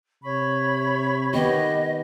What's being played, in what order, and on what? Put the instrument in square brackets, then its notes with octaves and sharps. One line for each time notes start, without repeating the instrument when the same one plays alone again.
[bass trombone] C3 [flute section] C#5 B5 C#6
[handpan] D#3 B3 G4 [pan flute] D#5